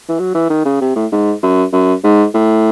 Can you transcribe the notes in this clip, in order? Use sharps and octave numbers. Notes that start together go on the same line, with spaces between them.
E3
F#3
E3
D#3
C#3
C3
A2
G#2
F#2
F#2
G#2
A2